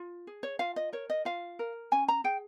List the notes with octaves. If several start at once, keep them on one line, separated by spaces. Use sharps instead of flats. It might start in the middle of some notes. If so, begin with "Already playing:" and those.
Already playing: F4
G#4
C#5
F4 F5
D#5
A#4 C#5
D#5
F4 F5
A#4
C#4 G#5
A#5
G#4 G5